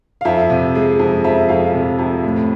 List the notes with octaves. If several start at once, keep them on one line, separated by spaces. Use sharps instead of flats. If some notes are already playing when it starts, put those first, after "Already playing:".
F5
F2 E5
C3
G#3
F2
F2 E5
F2 F5
C3
F2
A2